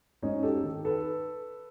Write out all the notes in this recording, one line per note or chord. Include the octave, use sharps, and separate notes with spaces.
G#2 C#4 D#4
G4 A4
D#3
A4 B4